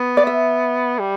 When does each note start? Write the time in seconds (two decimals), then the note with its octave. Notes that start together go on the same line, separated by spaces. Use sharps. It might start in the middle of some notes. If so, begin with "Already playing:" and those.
Already playing: B3
0.17 D5
0.27 E5
0.99 G3